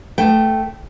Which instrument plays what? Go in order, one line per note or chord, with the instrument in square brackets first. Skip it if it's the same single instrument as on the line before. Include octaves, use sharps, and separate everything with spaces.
[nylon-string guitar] A3 G5